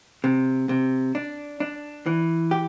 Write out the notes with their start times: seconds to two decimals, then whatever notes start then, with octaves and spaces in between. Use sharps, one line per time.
0.24 C3
0.69 C3
1.15 D4
1.60 D4
2.06 E3
2.51 G4